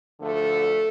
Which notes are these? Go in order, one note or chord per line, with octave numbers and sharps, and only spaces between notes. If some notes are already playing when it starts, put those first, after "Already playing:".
D2 D3 F3 A3 A4